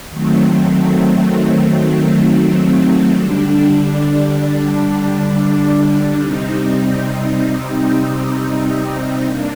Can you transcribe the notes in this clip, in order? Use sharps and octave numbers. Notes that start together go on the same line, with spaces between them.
D#3 F#3 A3 C4
D3 G3 D4
C3 G3 C4 D#4
A#3 D4